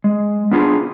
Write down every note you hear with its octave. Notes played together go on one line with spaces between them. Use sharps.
G#3
B3 D4 F4 G#4